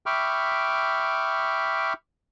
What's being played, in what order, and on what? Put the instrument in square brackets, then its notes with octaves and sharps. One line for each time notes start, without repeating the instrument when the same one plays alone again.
[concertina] E5 G5 B5 C#6 D6 F6